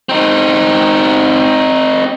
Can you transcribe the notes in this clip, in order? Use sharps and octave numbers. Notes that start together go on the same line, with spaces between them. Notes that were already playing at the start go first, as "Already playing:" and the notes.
C4 D#4